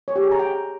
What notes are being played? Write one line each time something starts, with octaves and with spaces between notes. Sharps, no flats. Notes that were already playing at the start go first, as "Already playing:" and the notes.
C#5
G4
G#4
A#5
G5